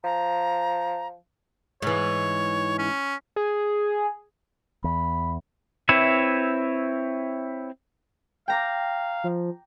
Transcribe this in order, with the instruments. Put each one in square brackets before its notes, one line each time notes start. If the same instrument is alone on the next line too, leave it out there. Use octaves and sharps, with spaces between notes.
[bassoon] F3 [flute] A#5
[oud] G#2 E3 [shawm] C#5
[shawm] C#4
[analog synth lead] G#4
[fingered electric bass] E2 [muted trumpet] B5
[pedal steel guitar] C4 E4 B4 C#5 E5
[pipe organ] F5 [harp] G5 A#5 D6
[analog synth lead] F3